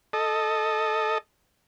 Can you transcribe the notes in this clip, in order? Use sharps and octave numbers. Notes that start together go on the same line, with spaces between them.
A4 D#5